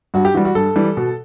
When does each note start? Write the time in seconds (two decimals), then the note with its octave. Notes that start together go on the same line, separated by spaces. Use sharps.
0.14 G2 F#4
0.25 G4
0.34 E3 G3 F#4
0.45 F#4
0.55 G2 A4
0.76 E3 G3
0.97 B2